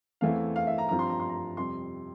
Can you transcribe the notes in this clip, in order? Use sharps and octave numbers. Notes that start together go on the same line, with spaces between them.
E2 E3 A3 C4 E4 F5
F5
E5
A#5
G2 F3 C4 F4 A#5
C6
A#5
C6
A#5
F2 C3 G3 C6